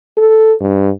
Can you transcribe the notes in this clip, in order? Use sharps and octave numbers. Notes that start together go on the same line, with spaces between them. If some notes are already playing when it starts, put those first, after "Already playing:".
A4
G2